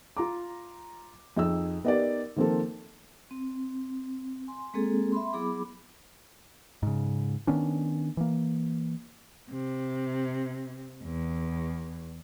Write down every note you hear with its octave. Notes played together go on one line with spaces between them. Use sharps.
F4 A#5 D6
F2 D#4 G#4 E6
B3 D#4 G4 A#4 D5
D#3 F3 A#3 C4 A4
C4
G#5 C6
G#3 A#3 C4 G#4 A4
E5 B5 C6
F#3 B3 E4 G#4 B5 D6
G#2 C#3
D#3 B3 C#4 D4
E3 A#3
C3
E2